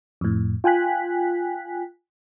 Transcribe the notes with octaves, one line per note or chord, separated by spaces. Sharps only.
F2 A2
F4 G5 G#5 F#6 B6